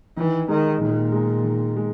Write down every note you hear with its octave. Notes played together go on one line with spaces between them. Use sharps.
D#3 E3
D#3 G#3 D#4
A#2 D#3
G#3 D#4
D#3
G#3